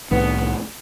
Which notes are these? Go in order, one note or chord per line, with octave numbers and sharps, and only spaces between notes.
C2 A2 D#3 B3